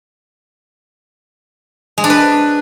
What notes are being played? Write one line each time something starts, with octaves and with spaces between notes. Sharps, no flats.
G#3
D4
B4